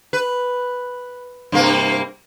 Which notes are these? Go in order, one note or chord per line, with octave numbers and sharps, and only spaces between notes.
B4
G2 C3 A#3